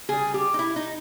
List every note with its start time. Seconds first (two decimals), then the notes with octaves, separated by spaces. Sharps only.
0.09 C#3 G3 G#4
0.34 G4
0.54 D#4
0.59 E4
0.76 D#4